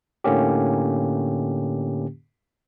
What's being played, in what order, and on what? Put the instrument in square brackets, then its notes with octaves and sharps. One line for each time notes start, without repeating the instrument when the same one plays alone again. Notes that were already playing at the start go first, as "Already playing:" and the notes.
[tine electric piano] A2 D3 A#3 C#4 G4